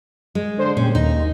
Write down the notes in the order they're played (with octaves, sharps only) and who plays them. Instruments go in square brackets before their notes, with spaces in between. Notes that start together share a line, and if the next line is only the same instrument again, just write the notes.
[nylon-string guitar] G#3
[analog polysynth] D3 C5
[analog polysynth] A#2 G3 [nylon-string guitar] C#4
[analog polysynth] D#2 [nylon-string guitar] D#4